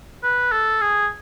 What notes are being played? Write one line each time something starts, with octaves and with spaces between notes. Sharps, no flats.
B4
A4
G#4